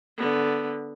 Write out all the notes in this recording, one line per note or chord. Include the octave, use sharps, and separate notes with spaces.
D3 B3